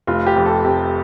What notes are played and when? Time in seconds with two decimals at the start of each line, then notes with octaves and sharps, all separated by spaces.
0.07 F1 F4
0.27 G4
0.36 F2
0.46 A4
0.65 C3